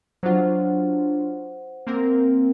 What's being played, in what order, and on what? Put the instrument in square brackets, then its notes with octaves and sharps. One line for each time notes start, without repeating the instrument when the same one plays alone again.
[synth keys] F#3 D4 F4 [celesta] C5 F#5
[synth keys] A#3 C4 A#4